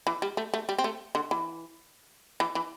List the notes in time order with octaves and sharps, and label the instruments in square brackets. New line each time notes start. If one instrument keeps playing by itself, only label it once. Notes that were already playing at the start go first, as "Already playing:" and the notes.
[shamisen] E3
G3
A3
A3
G3
C4
A3
D3
E3
E3
E3